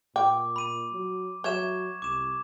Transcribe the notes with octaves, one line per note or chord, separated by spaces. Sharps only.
A#2 G5 D6
B5 D#7
F#3
F#3 C#5 E5 C#6 G#6 E7
C2 D6 E7